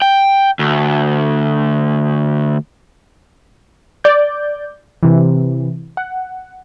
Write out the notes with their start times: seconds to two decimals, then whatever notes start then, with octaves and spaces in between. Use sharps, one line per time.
0.02 G5
0.59 D2
4.04 D5 G6
5.03 C3 E3
5.97 F#5